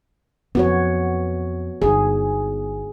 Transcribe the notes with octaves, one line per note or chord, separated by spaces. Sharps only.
F2 B3 F#4 C#5
G1 D#4 G#4